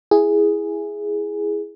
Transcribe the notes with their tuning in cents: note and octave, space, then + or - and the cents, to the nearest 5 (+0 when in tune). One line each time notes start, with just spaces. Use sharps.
E4 +0 G#4 +0